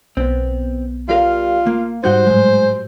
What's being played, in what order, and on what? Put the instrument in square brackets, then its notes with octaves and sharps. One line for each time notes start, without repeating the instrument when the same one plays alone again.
[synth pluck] B1 B3 [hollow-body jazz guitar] C4
[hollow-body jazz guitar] G3 A#4 F5 [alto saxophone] F4
[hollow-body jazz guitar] A#3
[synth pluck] G#2 G3 G6 [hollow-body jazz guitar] D#4 F#4 F#5 [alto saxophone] C5
[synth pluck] A2 F#3 [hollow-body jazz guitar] G#3